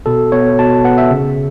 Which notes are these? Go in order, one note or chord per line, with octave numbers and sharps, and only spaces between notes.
B2 A4
B3 C#5
B2 A5
B3 F#5
E5
C#3